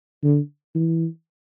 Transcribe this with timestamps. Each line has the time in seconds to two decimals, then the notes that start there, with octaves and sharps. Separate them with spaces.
0.23 D3
0.75 E3